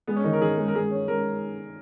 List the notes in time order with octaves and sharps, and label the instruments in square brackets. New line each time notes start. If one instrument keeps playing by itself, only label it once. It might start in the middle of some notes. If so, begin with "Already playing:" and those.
[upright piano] G#3 [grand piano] B3
[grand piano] C#4
[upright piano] D#3 [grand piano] D#4
[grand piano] A#4
[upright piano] D#3 [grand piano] G#4
[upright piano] G#3
[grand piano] A#4
[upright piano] G#3 [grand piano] G#4
[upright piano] C#4
[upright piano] G#3 [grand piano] A#4